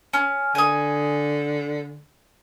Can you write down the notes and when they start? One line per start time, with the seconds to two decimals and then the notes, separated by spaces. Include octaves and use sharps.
0.13 C#4
0.55 D3 G#5 D#6